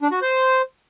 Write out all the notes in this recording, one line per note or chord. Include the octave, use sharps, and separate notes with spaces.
D4
F#4
C5